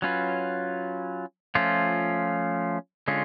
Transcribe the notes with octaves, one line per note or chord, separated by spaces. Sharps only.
F#3 C#4 F4 B4
F3 A3 C#4 F4
D3 G#3 C#4 F4